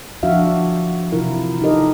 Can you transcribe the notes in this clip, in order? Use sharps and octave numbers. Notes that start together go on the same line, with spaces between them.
F3 D4 F#4 E5 F5
C3 E3 E4 F4 A#4
D#4 G4 A4 A#4 D#5